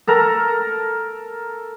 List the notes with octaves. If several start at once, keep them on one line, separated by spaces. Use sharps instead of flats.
A4 A#4 A#5